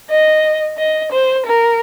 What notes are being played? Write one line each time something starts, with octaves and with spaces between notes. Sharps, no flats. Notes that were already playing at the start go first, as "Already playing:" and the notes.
D#5
D#5
C5
A#4